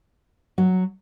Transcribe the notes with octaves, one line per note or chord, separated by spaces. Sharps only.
F#3 F#4